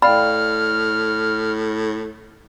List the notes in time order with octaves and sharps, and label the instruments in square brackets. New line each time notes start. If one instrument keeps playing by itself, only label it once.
[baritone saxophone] A2 [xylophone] D5 F5 G5 [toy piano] B5 [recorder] F6